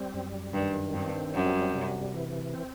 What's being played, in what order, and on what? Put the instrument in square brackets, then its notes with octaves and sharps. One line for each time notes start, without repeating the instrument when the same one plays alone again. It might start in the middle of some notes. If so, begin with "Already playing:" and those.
Already playing: [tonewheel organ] G3 C4
F#2
[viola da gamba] G2 [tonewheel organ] D#3
[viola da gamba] G2 [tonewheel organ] C4
[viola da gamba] F#2 [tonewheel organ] G3
[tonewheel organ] C3
E3
C4